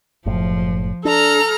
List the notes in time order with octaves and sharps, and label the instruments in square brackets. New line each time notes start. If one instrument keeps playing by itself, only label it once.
[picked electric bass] F#1 A2 [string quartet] F3
[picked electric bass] D4 [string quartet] A4 A#5 F6